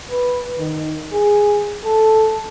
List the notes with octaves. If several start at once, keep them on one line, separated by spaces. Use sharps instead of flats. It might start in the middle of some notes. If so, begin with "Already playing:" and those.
B4
D#3
G#4
A4